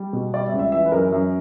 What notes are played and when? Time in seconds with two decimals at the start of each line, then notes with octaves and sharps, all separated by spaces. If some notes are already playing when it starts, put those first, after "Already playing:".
Already playing: G3
0.13 B2
0.34 G3 D5
0.46 E5
0.52 C#2 D5
0.59 E5
0.72 E3 E5
0.86 B4
0.92 F#2 A#4
1.12 F#2